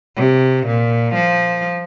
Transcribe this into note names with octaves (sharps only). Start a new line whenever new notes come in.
C3
A#2
F3